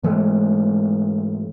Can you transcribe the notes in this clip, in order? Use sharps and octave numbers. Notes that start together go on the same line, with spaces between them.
G#2 E3 G#3 A3